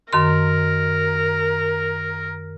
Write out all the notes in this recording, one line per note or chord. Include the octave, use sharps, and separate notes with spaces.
F#2 D#3 A#4 C6